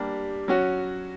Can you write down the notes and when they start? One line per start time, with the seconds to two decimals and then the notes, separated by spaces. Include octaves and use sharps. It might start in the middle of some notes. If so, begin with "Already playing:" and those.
Already playing: G3 A#3 D4 G4
0.48 F#3 C#4 F#4